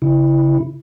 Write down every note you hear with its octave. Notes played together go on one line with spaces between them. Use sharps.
C#3 E4